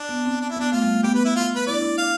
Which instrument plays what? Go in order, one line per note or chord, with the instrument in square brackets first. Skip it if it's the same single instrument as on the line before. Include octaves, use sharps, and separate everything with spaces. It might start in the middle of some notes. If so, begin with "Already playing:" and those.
Already playing: [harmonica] D4
[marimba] B3
C4
[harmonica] D4
E4
[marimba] B3 [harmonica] D4
[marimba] A3 [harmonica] F4
[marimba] G3
A3
[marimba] B3 [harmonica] G4
[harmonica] B4
E4
F4
B4
[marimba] E4 [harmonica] D5
[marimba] D4
E4
[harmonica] F5